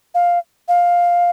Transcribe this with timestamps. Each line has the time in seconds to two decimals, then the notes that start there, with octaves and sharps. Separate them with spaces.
0.15 F5
0.68 F5